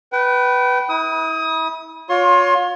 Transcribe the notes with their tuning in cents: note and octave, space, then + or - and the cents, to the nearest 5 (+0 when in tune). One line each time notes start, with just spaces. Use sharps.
B4 +0 G5 -35
E4 -35 D#6 +20
F4 +35 C#5 +20 C6 +30